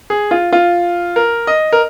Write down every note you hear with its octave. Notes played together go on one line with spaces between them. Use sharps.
G#4
F4
F4
A#4
D#5
A#4